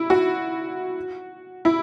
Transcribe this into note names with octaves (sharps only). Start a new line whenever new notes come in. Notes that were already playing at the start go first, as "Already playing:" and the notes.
Already playing: E4
F#4
E4